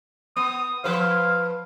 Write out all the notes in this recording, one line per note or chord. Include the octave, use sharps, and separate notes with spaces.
B3 D#6
F3 B4 C5 F5